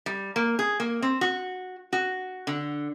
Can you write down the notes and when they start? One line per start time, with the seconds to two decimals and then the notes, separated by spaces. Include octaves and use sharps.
0.06 G3
0.36 A#3
0.59 G#4
0.80 A#3
1.02 C4
1.21 F#4
1.93 F#4
2.47 D3